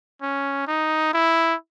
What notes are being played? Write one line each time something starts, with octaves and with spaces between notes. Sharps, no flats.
C#4
D#4
E4